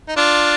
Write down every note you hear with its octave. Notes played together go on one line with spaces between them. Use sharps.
D#4
D4 F4